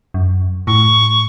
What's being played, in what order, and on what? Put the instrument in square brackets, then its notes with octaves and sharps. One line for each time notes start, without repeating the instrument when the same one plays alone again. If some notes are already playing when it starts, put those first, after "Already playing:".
[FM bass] F#2
[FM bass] A2 [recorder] C#6